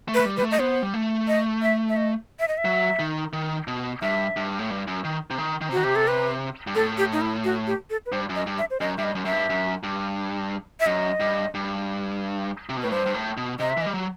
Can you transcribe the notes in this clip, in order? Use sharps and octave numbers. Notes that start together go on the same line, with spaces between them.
A3
B4
A3
G3
G3 B4
A3
D#5
B3 C5
G3
A3
D#5
E5
E5
D#5
E5
D#5
E5
F#3
D#3
D#3
B2
G2 E5
G2
A2
G2
F#2
D#3
C3
D#3
D#3
C3
D#3 F#4
C3 G4
A4
B4
G2
A2 A4
G4
D#4
E4
F#4
G4
A4
B4
G2 C5
F#2
D#5
G2
E5
C5
F#2 D#5
G2 E5
D#5
F#2
F#2 E5
G2
F#2
G2
E5
F#2 D#5
G2
G2
C3
B2
A2 B4
G2 C5
G2
A2
B2
C3 D#5
E5
E3
D#5
G3
F#3